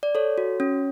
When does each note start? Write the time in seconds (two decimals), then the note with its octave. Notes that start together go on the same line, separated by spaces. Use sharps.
0.03 D5
0.15 A4 C#5
0.38 F#4
0.60 C#4